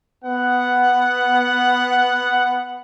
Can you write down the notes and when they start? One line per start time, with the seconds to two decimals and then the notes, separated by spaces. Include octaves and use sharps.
0.24 B3 F#5